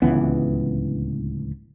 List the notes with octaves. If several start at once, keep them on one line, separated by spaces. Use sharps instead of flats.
D1 C#2 E3 B3